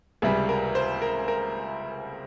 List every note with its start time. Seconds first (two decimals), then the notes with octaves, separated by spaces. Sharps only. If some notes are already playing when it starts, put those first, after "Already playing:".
0.22 C#2 C3 G3 G#4
0.49 A#4
0.75 C5
1.02 A#4
1.28 A#4